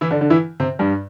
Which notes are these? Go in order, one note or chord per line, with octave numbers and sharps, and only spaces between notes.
E3 E4
D3 D4
D3 D4
E3 E4
C3 C4
G2 G3